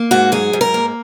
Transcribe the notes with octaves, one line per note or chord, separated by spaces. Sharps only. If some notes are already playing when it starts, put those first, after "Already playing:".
Already playing: A#3
G#2 F#4
F#3 G#4
G#2
A#4
A#3